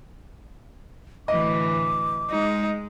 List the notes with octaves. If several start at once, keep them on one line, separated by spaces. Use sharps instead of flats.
D2 A2 E3 D#5 D6
G#3 D#4